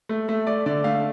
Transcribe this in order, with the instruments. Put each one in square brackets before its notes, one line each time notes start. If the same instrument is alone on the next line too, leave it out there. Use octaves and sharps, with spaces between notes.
[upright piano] A3
A3 E5
A3 D5
D3 D5
A3 F5